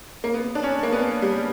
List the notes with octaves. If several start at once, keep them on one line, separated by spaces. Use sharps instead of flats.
A#3
B3
D4
C#4
A#3
B3
G3